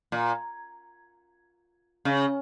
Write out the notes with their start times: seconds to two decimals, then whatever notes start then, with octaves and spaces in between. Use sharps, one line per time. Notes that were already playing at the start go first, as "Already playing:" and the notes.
0.12 A#2
2.05 C#3